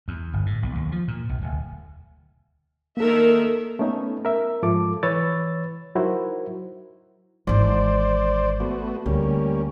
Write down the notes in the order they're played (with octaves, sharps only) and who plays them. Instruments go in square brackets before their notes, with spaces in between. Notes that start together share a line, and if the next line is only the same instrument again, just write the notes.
[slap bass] E2
G1
A2
B1
D#2
F3
A#2
B1
D1
[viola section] D#3 A#4 E5 [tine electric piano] A#3 A4
[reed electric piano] A3 B3 C#4 D#4
A#4 E5
G#2 F3 F4 A4 D6
E3 B4 C#5 E6 A6
F#3 D#4 E4 F#4 A#4 C5
[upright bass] G#1 E3 [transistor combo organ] C5 D5
[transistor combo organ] A3 B3 F#4
[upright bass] D2 [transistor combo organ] G3 A#3 C#4